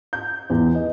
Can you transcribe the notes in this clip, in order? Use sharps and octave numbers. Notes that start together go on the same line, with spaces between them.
G6
E2
D#5